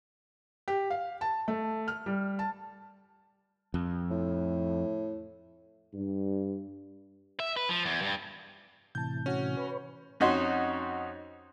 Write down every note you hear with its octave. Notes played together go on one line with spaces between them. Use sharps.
G4
F5
A5
A3
F6
G3
A5
F2
A2
G2
E5
B4
F3
E2
G2
A2 C3 E3 A5 G6
C#4 F#4
B4 C#5
F2 C#4 D#4 F#4 C6